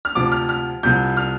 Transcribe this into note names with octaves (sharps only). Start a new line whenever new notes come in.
F6
D2 C3 F3 D6
F6
F6
C2 C3 F3 G6
F6